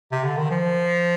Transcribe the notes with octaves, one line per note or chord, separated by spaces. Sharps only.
C3
D3
D#3
F3